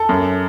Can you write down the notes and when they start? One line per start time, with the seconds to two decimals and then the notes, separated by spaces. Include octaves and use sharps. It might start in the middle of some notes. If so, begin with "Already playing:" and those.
Already playing: A4
0.09 F#2